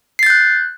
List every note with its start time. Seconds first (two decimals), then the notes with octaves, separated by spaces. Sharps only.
0.19 C7
0.23 A6
0.26 G6
0.30 F#6